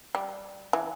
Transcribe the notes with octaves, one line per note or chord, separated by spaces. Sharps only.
G3
E3